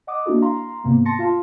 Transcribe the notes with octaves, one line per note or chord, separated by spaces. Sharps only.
D#5 F#5 D6 D#6
A#3 D4 E4 F#4 A4
F5 A#5 C6
G#2 C3 A#3 B3
A5 C6 A6 A#6 C#7
F4 F5 A5 C6